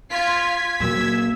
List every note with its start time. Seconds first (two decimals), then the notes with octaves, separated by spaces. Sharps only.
0.10 F4 G#6 B6 C7
0.80 A#2 F#3 A#3 E6